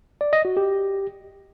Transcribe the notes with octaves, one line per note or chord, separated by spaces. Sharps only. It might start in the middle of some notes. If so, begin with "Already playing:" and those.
D5
D#5
F#4
G4